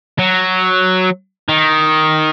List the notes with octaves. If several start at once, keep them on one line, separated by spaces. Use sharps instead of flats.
F#3
D#3